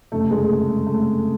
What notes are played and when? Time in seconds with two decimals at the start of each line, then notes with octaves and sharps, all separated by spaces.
0.12 F#1 F2 C3 A3
0.31 G#3
0.86 A3